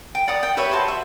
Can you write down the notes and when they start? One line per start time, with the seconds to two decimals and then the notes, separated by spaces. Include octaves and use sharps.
0.15 G5
0.28 D5 F#5 A#5 D#6
0.43 G5
0.57 G4 B4 C#5 E5
0.72 F#4 C5 A5 C6
0.88 E5